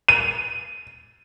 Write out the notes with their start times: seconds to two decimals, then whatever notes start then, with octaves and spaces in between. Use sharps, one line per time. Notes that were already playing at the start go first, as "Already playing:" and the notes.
0.08 D#7